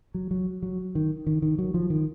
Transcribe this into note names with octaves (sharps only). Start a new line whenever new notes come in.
F#3
F#3
F#3
D#3
D#3
D#3
F#3
F3
D#3